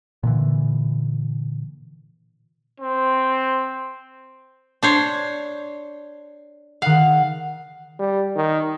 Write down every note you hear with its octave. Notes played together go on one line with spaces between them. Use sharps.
A#2 D3 E3
C4
D4 C5 C#5
D#3 F5 F#5
G3
D#3